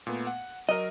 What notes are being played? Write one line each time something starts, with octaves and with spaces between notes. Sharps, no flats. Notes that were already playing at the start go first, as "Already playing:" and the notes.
A#2 A3 B3
F#5
F#3 A#4 D#5